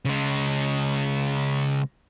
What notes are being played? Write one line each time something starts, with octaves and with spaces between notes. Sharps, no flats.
C#3 G#3